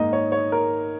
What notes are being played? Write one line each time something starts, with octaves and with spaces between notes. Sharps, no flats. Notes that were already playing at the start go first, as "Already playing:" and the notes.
Already playing: G#2 D#3 A#3 D#4 D#5
C#5
C#5
A#4